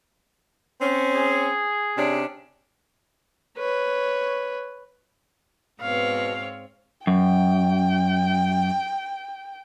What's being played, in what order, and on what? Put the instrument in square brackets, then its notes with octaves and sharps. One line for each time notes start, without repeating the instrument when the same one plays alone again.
[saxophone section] C4 C#4
[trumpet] G#4
[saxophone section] C3 C#4 D4
[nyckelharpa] B4 C#5
[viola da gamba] G#2 C4 C#5 [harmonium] B2 [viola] F5
[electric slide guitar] F#2 [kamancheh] G5